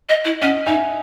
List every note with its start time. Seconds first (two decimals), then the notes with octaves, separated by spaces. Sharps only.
0.09 D#5
0.25 E4
0.42 C#4 D#5 F#5
0.67 D#4 E5 G#5